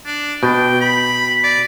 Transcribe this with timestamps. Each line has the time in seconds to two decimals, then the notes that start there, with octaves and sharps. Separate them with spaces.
0.06 D4
0.43 B2 G5
0.81 B5
1.44 D5